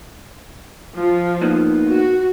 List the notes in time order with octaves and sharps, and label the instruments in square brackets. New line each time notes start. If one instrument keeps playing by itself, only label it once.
[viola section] F3
[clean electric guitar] A#3 B3 D#4
[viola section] F#4